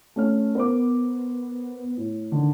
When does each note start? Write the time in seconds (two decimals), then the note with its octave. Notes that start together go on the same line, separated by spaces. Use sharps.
0.16 A3 C#4 F6
0.55 B3 A#4 C5 D6
1.97 A2
2.32 D3 D#3